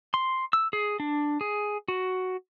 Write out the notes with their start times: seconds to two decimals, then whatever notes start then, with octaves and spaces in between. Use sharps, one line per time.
0.14 C6
0.53 E6
0.73 G#4
1.00 D4
1.41 G#4
1.88 F#4